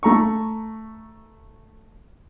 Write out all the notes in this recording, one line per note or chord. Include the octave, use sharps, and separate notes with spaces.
A3 A#5 C#6